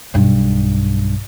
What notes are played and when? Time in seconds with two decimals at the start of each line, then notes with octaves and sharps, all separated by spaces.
0.14 B1 G2